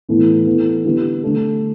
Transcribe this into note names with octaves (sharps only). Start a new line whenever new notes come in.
A2 E3 B3 E4 A4
E3 B3 E4 A4
D3 G3 B3 E4 G4
D3 A3 D4 A4